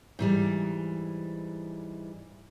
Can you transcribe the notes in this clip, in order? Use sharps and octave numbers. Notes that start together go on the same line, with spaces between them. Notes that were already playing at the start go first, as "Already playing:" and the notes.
G#2 E3 G3